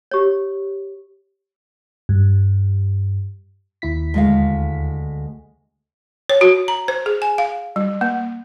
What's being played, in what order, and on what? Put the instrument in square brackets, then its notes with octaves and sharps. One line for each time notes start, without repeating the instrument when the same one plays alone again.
[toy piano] G4 C#5
[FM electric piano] G2
D#2 E4 B6
[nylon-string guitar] D2 G#3 F5
[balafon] C#5
F#4
A#5
C5
G#4
G#5
F5
G3
A#3